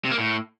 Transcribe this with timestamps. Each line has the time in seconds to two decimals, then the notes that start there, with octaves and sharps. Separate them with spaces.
0.05 C3
0.11 A#3
0.18 A2